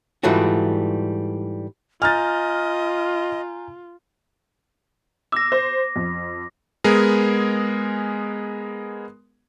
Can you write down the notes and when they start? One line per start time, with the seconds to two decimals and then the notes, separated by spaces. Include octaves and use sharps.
0.23 G#2 E3 G3 A3 F4 F#4
2.02 F4 D#5 G#5 A#5 F6 G6 A6
5.32 D6 E6 A#6
5.52 C5
5.96 F2
6.84 G#3 B3 G#4 A#4